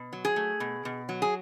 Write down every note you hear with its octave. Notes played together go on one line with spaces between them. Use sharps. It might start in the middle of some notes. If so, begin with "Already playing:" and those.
Already playing: B2
F#3
G#4
A3
B2
B2
F#3
G#4